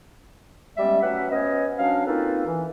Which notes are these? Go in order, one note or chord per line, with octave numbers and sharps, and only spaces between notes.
G3 G#3 B3 C#4 D5 E5
F#3 A3 C#4 B4 E5 F#5
B3 C#4 C5 C#5 D#5
F#3 C#4 D4 F5
A#3 C4 D#4 F4 A4 B4
E3